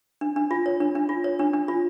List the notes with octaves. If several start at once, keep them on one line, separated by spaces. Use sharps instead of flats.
D4
D4
F4
C#5
D4
D4
F4
C#5
D4
D4
F4